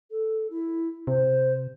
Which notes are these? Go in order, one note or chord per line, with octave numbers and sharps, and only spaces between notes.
A4
E4
C3 C5